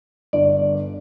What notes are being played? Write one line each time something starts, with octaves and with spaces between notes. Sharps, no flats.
G1 D5